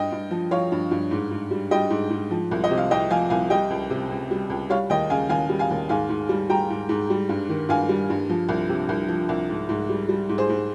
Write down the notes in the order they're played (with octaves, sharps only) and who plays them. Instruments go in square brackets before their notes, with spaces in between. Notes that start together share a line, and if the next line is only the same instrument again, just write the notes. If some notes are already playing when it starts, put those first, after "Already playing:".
Already playing: [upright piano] G2 D#5 G5
G2
F3
F3 C#5 F5
G2
G2
G#2
G#2
G3
G3 D#5 G5
G#2
G#2
F3
C2
D#5
C3
F5
C2 D#5 G5
F3 F5 G#5
C2 F5 G#5
G3 D#5 G5
C#2
C3
C#2
G3
C#2
G3 C#5 F5
D#2 D#5 G5
C#3 F5 G#5
D#2 F5 G#5
G3
F5 G#5
D#2
G#2 F5 G#5
G#2
G3
G3 G5 A#5
G#2
G#2
G3
G2
D#3
G2 F5 G#5
G3
G2
F3
C2
C3
C2
F3
C2
G#2
G#2
G3
G3
G#2
G#4 C5
G#2